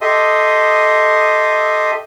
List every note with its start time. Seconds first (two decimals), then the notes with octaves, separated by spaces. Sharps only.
0.01 G4 A4 D#5 E5 C6 D#6